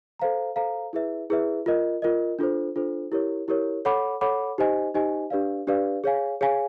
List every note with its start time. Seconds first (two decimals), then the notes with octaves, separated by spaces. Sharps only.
0.19 A4 C5 F5 A#5
0.56 A4 C5 F5 A#5
0.93 E4 G#4 B4 E5
1.30 E4 G#4 B4 E5
1.66 F4 A#4 D#5
2.02 F4 A#4 D#5
2.39 D4 F4 A4 C5
2.76 D4 F4 A4 C5
3.12 E4 G4 A#4 C#5
3.48 E4 G4 A#4 C#5
3.85 A4 C#5 F#5 B5 D6
4.21 A4 C#5 F#5 B5 D6
4.58 D#4 G4 C5 D#5 G#5
4.94 D#4 G4 C5 D#5 G#5
5.30 D4 G4 B4 D5 F5
5.67 D4 G4 B4 D5 F5
6.04 G#4 C#5 F5 G#5
6.41 G#4 C#5 F5 G#5